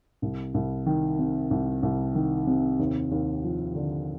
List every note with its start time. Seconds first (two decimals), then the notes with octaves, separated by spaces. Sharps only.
0.22 C2
0.54 C2
0.86 D#3
1.19 C3
1.51 C2
1.83 C2
2.15 D#3
2.47 C3
2.79 D#2
3.11 D#2
3.43 F3
3.75 D3